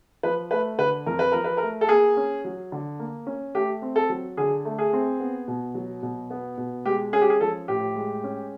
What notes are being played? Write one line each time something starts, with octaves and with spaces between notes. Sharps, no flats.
F3 B4
A3 B4
D3 B4
F2 A#4
B4
F3 A#4
B4
A3 A#4
A4
A#3 G#4
C#4
F#3
D3
A#3
C#4
A3 G4
C4
A4
F#3
D3 G#4
A3
G#4
C4
B3
B2
F#3
B2
B3
B2
G#3 G4
C#4 G#4
G4
G#4
F3 A4
A2 G4
G#3
C#4